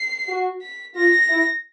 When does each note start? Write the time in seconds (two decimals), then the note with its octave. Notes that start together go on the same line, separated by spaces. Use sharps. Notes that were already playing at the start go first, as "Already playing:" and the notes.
Already playing: C7
0.28 F#4
0.62 B6
0.95 F4 A#6
1.29 E4